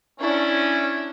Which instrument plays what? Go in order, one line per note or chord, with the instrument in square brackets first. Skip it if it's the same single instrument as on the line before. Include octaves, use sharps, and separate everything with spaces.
[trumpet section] C#4 [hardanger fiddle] D4 E4